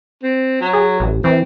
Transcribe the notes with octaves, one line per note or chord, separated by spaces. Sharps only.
C4
F#3
G#4
A1
E3 C4